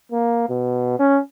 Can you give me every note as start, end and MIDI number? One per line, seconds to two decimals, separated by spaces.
0.12 0.47 58
0.49 0.97 47
0.99 1.19 61